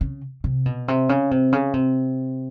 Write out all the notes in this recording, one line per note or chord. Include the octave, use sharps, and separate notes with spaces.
C#3
C3
B2
C3
C#3
C3
C#3
C3